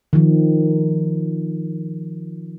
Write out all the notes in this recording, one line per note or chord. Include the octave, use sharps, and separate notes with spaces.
D#3 F3